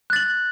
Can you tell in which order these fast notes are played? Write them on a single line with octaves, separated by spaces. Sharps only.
F#6 A6 F#7